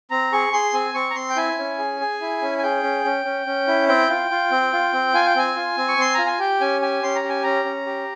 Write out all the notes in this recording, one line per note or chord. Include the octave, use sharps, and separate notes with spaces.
C4 A#5
G#4 C#6
G#4 C6
C4 G#5
C4 C#6
A#5
C4 C6
G5
E4 G#5
C#4
G#4
G#4
E4
C#4
G#5
G#4 G5
C#4
C#4
C#4
C#4
E4
C4 G5
F4
F4
C4
F4
C4
F4 G#5
G5
C4 G#5
F4
C4
C#6
C4 C6
F4 A#5
G#5
G4 G5
C#4 G#5
G4 G#5
C#4 C6
A#5
G4
G#5
C#4 A#5
C#4
G4